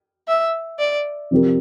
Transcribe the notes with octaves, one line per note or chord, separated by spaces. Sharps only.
E5
D5
C3 F3 C4 G4 A#4